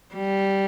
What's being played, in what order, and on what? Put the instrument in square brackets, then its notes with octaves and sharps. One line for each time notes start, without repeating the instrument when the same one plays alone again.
[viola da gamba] G3